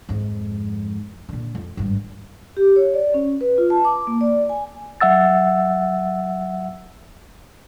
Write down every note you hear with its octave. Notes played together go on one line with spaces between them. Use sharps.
F2 G#2
A#2 D3
F2
G#1 G2
G4
C#5
D5
C#4
B4
F4
A5
D6
A#3
D5
G#5
F#3 E5 F#5 E6 A6